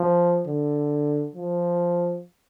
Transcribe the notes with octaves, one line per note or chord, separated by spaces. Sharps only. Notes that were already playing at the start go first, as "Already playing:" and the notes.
Already playing: F3
D3
F3